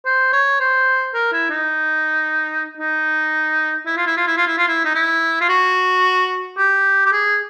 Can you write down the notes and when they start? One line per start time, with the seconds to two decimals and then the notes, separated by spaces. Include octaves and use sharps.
0.05 C5
0.33 C#5
0.60 C5
1.14 A#4
1.33 E4
1.50 D#4
2.77 D#4
3.86 E4
3.97 F4
4.07 E4
4.17 F4
4.27 E4
4.37 F4
4.47 E4
4.58 F4
4.68 E4
4.85 D#4
4.95 E4
5.41 F4
5.49 F#4
6.58 G4
7.06 G4
7.12 G#4